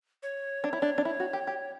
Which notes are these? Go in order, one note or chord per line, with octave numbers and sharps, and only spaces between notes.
C#5
D4
E4
D4
D4
E4
F#4
G4
G4